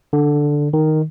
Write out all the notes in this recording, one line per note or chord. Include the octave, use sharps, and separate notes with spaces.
D3
D#3